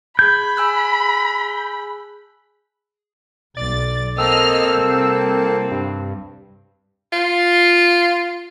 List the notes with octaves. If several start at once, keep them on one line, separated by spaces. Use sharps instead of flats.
G#4 A5 B5 G6 G#6
G#5 E6 F#6
B1 D5 A6
A#3 C4 A4 D#5 E6 F6
C2
G2
F4